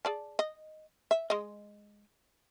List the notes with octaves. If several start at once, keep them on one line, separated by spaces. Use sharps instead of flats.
G#4 D5 A5
D#5
E5
G#3 D#5